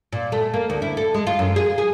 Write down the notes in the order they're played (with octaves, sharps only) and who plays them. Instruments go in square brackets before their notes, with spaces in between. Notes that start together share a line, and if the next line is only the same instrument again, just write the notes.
[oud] A#2
A3
A#3
D2
E4
A4
G#3
F4
F#2
G#4
G#4